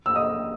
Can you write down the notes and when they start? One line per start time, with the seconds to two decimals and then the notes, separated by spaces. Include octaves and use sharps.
0.06 E6
0.16 D#5 D#6